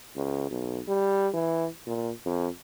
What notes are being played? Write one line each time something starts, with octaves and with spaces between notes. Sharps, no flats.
C#2
B1
G3
E3
A#2
F2